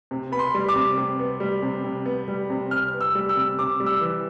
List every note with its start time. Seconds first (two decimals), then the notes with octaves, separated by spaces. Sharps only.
0.11 C3
0.32 B3 B5
0.39 C6
0.54 G3
0.69 D6
0.75 C3
0.98 C3
1.19 B3
1.40 G3
1.62 C3
1.84 C3
2.06 B3
2.28 G3
2.50 C3
2.71 C3 F6
2.93 B3
3.01 E6
3.15 G3
3.29 E6
3.36 C3
3.58 C3 D6
3.80 G3
3.86 E6
4.01 E3